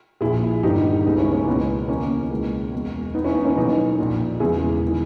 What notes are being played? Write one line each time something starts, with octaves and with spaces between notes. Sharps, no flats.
A#1 A#2 E4 G#4
G1 G2 D#3 D#4 G4
C#2 C#3 E3 B3 D#4
C#4 E4
A#3 C#4
C#2 B2 B3
D#2 C#3 E3 A#3 C#4
C#2 B2
E1 E2 B2
D#2 D#3 B3 D#4
C#4 E4
B3 D#4
A#3 C#4
B1 B2 B3 D#4
A#1 A#2
E1 E2 C#3 E3 E4 G#4
D#3